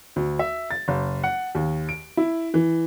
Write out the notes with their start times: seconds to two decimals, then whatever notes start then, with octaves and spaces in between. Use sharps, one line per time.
0.16 D2
0.39 E5
0.71 A6
0.88 F#1
1.24 F#5
1.55 D#2
1.89 D7
2.17 E4
2.54 E3